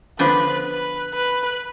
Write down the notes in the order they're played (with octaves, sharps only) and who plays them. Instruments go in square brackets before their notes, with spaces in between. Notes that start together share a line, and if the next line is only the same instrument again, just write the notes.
[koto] D3 F3 B3 D4 [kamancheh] B4
[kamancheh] B4
B4